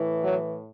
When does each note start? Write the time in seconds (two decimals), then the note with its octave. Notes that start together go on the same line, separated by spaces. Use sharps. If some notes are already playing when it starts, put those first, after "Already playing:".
Already playing: A2 E3
0.23 F#3